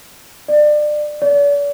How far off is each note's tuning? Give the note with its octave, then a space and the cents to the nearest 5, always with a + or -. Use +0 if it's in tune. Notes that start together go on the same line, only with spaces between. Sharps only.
D5 +30
D5 -45